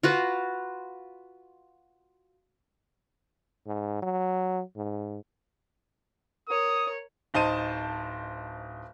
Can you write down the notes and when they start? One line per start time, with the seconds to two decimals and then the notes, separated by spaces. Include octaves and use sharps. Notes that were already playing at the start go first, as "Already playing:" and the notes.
0.03 F4 F#4 B4
3.66 G#2
4.02 F#3
4.76 G#2
6.48 A#4 C#5 D#6
7.34 D1 D#4 C5 A5 D#7